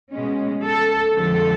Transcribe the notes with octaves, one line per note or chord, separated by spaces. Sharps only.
B2 G#3 C#4
A4
F2 D3 F3 G#3 A4